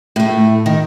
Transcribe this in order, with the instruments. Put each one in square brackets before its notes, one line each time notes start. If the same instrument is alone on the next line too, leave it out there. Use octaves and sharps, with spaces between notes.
[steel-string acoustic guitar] A2 A3
D#3